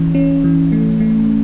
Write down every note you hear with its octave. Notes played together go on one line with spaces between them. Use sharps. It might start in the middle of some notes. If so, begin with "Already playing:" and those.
Already playing: E3 C#4
C#4
E3
A3
A3